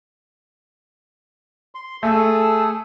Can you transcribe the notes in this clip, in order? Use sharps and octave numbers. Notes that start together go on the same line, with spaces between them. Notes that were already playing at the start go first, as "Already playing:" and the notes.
C6
A3 G#4 A4 A5